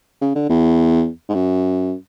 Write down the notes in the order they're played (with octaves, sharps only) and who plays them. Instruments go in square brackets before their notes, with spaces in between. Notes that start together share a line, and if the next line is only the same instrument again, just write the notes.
[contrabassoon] C#3
D3
E2
G#2
F#2